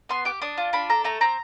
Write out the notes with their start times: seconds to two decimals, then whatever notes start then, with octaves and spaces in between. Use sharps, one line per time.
0.09 B3 C6
0.25 G4 D6
0.41 D4 D#6
0.58 F4
0.73 D4 B5
0.90 A4 A#5
1.04 A3 A#5
1.21 C4 A#5